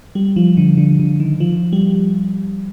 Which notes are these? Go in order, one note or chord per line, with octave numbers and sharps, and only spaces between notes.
G3
F3
D3
D3
D3
D#3
F3
G3